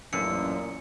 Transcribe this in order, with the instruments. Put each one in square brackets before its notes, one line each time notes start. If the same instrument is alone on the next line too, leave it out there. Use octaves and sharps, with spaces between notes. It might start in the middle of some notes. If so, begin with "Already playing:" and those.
[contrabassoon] A1 [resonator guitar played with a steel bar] F#2 [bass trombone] A#2 [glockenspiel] C#7